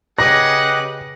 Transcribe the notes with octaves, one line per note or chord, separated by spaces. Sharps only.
C#3 G4 G#4 B4 D#5 F#5 F#6 A#6